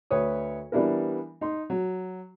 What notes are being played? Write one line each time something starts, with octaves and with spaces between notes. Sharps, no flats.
D2 B4 C#5 D#6
E3 G3 B3 D4 E4 A#4
D#4 C6
F#3